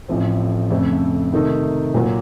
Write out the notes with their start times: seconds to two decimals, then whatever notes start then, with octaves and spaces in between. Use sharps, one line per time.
0.08 A1 A2 F3 C4
0.71 F2 C#3 A3
1.32 C3 D#3 A3 D#4 A4
1.94 A#2 F#3 A#3 F4